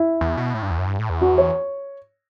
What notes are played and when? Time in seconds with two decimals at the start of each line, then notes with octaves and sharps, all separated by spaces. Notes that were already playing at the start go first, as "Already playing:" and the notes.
Already playing: E4
0.21 E2
0.37 B2
0.54 A2
0.63 G2
0.71 E2
0.78 F#2
0.87 G2
0.99 A2
1.10 E2
1.21 F#4
1.38 C#5